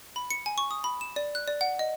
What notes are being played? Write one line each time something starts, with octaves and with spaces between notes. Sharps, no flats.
B5
C#7
G#5
C#6
D#6
B5
E7
D5
F#6
D5
F#5
D#5